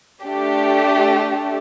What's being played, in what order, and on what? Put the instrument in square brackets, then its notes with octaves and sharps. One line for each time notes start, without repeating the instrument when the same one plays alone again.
[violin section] A3 D4 G4